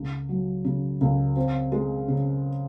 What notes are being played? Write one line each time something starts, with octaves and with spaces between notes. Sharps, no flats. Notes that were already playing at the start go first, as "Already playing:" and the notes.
Already playing: C#2
F#3
C#3
C#2
C4
G#3
C#3